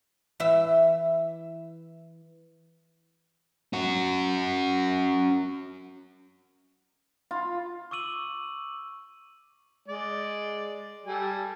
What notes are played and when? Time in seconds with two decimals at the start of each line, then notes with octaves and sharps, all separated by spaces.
0.40 E3 E5
3.73 C#4 F#4
7.31 F4
7.91 C#6 D6 E6 D#7 F#7
9.88 G#3 D5
11.06 G3 A4 G#5